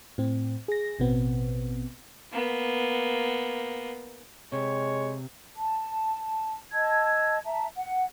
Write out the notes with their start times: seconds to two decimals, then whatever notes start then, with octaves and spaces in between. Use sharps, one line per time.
0.18 A2 C4
0.68 G#4 A#6
0.99 A1 B2 B3 C4
2.32 A#3 B3
4.52 C3 G#3 C#5
5.55 A5
6.73 D#5 A5 E6 G#6
7.45 E5 A5 A#5
7.76 F#5